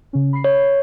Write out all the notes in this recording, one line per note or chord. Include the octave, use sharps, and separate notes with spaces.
C#3 C#4
B5 C7
C#5